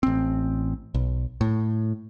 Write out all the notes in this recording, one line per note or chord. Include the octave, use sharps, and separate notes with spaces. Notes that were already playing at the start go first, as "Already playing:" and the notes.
A1 C4
B1
A2